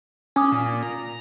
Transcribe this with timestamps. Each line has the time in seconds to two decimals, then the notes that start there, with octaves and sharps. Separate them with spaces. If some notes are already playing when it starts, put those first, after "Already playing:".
0.36 C#4 G#5 D6 D#6
0.52 A#2
0.83 A#5